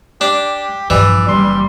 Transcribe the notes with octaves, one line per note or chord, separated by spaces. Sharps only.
D4 G4
A#1 G2 E3 D5
F#1 G3 C6